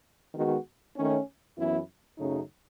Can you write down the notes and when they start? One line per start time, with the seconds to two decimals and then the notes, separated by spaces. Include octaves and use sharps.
0.34 D#3 G#3 B3 F#4
0.96 D#3 A3 C#4
1.57 F#2 E3 B3 E4
2.18 F#2 C#3 F#3 A3 D#4